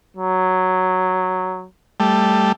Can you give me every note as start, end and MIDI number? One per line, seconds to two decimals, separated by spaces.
0.17 1.67 54
2.00 2.52 55
2.00 2.52 57